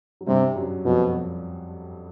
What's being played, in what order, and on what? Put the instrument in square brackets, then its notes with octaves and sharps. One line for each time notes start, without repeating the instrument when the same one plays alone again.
[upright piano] F#3
[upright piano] G2 G3 [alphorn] C3
[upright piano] F#2 F#3
[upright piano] F2 F3 [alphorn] B2